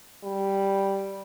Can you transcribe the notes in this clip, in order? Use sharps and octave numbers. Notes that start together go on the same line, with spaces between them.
G3